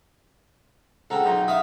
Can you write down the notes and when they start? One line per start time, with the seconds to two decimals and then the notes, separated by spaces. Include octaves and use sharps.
1.10 C#2 C4 A4 F#5 G5 A#5
1.25 B1 D#4 A#5
1.48 E5 F5 D#6